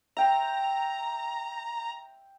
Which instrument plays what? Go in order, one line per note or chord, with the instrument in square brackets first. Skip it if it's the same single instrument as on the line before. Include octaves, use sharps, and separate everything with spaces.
[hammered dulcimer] E5 G5 C6 [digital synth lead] A#5